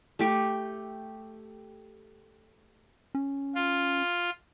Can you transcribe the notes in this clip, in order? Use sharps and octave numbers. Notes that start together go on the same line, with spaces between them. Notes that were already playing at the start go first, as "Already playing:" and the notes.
A3 G4 G5
C#4
F4